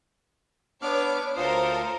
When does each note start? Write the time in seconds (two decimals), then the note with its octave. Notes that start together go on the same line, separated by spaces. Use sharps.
0.82 B3 D4 B4 C#5 D6 F6
1.36 D2 F4 A4 A#4 C5 D#6